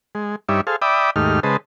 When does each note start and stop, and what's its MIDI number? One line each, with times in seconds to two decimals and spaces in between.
0.15 0.36 56
0.49 0.61 43
0.49 0.61 55
0.49 0.61 63
0.49 0.61 73
0.49 0.61 74
0.49 0.61 76
0.67 0.76 68
0.67 0.76 69
0.67 0.76 72
0.67 0.76 77
0.82 1.10 74
0.82 1.10 76
0.82 1.10 79
0.82 1.10 83
0.82 1.10 86
0.82 1.10 87
1.16 1.40 39
1.16 1.40 44
1.16 1.40 57
1.16 1.40 63
1.16 1.40 67
1.16 1.40 89
1.43 1.57 49
1.43 1.57 56
1.43 1.57 71
1.43 1.57 72
1.43 1.57 75
1.43 1.57 81